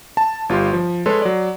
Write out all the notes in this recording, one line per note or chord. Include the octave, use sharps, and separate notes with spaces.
A5
G1 F4 G4 C6
F3
G#3 A4 B4 C#5 C6
F#3 D5